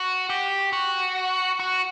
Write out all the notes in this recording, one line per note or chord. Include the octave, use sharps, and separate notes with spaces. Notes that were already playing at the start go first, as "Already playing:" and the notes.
Already playing: F#4
G4
F#4
F#4